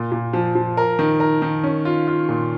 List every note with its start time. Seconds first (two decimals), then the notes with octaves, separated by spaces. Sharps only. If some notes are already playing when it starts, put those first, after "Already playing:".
Already playing: A#2
0.12 A#2
0.33 F3
0.55 F3
0.77 A#4
0.99 D#3
1.20 A#4
1.42 D#3
1.63 C#4
1.85 F4
2.08 F4
2.29 A#2